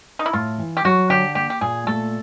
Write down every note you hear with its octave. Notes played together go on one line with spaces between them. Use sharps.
D#4
E4
A2 F4
E3
G4
F#3 F#4
D3 G4
A#3 G4
G4
A#2 G#4
A3 A4